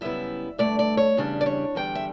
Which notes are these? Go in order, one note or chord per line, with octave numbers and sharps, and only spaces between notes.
F#2 C#3 G3 B3 E4 E5
G2 D3 A3 D5
D5
C#5
E2 C#3 G3 D4
D5
C#5
E2 D3 G3 G5
E5